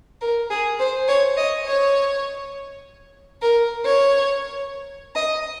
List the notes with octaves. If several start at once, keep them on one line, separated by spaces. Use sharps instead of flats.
A#4
G#4
C5
C#5
D#5
C#5
A#4
C#5
D#5